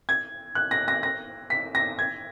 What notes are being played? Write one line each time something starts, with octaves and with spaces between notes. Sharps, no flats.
G#6
F#6
A#6
A#6
A#6
B6
A#6
G#6